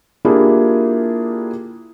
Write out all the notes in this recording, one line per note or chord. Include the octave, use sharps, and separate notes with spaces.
A#3 D4 E4 F4 G4 G#4